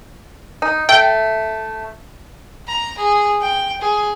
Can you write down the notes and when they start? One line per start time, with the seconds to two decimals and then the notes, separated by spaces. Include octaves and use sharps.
0.62 D#4
0.89 A3 G5
2.68 A#5
2.97 G#4
3.41 G5
3.81 G#4